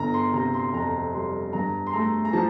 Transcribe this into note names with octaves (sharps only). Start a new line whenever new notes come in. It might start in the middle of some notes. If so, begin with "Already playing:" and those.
Already playing: G1 A#5
C6
C3 A#5
C6
F2 A#5
G3 C6
G2 A#5
C6
A3 A#5
A#5
F3 A5